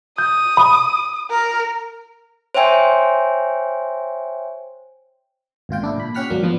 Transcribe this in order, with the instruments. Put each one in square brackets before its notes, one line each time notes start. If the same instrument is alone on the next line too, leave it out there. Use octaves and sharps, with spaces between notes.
[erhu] D#6 [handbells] G6
[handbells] B5
[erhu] A#4
[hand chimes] C5 C#5 E5 G5 G#5 C6
[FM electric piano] G#1 A#2 F4 G5
D3 D4 E4
A#2 B5
C#4 G4 F#5 F6 B6
G#1 F#3 A#3 D4
F3 B3 D4